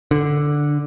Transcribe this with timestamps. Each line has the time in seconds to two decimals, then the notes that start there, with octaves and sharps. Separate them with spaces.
0.11 D3